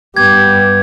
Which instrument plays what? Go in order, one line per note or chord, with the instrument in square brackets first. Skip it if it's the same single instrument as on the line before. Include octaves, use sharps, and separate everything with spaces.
[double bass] G2 B3 [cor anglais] G4 [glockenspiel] G#6